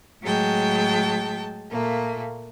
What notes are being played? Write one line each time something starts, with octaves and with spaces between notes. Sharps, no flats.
A2 F#3 G#3 G5 A5
A#2 A3 A#3